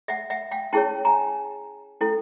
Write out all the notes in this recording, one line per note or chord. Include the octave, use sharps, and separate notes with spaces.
E5 F#5
E5 F#5
F5 G5
C#4 E4 G#4 C#5 G5 A5
G#5 A#5
C#4 E4 A4